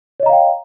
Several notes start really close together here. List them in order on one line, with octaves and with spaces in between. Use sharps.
C#5 D#5 A#5 F5 G5